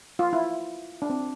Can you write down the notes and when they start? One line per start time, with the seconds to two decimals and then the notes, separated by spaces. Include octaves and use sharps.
0.19 F4
0.33 E4
1.02 D4
1.10 C4